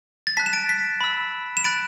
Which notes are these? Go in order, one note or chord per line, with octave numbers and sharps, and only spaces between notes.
A6
A5 F#6 B6
E7
A6 D7
B6
B5 E6
E7
B5 F#6 A6 D7